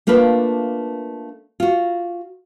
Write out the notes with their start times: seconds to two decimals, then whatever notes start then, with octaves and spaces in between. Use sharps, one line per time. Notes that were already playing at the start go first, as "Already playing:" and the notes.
0.07 A3 A#3 D4 F4 B4
1.60 F4 F#4